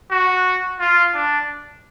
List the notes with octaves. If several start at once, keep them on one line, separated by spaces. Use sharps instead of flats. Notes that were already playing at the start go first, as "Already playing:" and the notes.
F#4
F4
D4